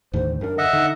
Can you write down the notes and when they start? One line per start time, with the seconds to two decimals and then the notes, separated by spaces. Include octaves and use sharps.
0.13 D#2 A2 D3 C5
0.41 F#2 D4 A#4
0.58 D3 D#5 E5 F#5
0.73 D3 D#4